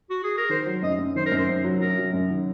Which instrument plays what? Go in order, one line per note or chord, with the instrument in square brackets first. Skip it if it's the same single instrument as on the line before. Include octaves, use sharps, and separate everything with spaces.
[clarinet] F#4
G#4
A#4
[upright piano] D#3 [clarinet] C5
[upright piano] F#3
[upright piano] F#2 [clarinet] D#5
[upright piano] F#2
[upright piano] D#3 [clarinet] C5
[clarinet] A#4
[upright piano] F#2
[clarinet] C5
[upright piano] F#2
F#3
[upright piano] F#3 [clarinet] A#4
[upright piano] F#3
F#2
D#3